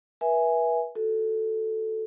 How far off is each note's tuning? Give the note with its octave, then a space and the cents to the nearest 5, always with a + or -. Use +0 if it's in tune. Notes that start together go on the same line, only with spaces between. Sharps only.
B4 -35 E5 +0 G#5 +0
F#4 -5 A4 +0